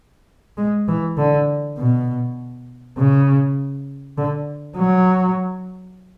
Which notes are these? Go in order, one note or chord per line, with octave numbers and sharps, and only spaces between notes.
G#3
E3
D3
B2
C#3
D3
F#3